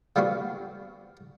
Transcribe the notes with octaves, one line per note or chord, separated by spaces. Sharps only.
F3 G3 B3 D4 F#4